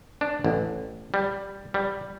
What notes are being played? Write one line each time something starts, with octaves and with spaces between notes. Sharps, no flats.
D4
A1
G3
G3